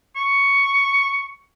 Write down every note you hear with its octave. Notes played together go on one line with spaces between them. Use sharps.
C#6